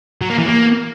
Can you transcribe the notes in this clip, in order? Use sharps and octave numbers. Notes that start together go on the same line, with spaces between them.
F#3
A#3
E3
A#3